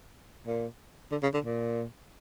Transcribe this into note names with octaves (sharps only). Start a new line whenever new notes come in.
A#2
D3
C#3
D3
A#2